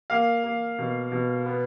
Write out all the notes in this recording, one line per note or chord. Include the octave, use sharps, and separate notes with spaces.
A#3 F5
A#3
B2
B2
B3